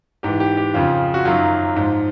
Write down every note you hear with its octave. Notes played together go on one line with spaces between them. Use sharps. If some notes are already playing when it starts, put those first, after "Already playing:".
G#2 E3 G4
G4
G4
F2 C#3 F3 F4
F#4
F#2 D#3 F#3 F4
G#2 F3